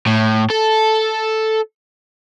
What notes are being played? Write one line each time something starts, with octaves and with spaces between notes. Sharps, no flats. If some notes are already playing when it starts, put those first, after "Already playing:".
A2
A4